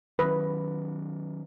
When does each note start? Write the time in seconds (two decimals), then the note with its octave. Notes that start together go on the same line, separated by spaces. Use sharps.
0.19 D#3 F#3 C#4 B4